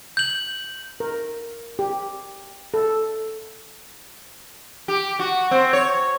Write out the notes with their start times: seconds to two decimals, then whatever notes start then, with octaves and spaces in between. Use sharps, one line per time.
0.17 G6 F#7
1.00 A#4
1.79 G4
2.74 A4
4.88 G4
5.19 F#4
5.51 C4
5.73 C#5